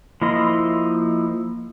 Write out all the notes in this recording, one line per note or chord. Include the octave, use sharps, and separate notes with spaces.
F3 A#3 E4 D#5 C6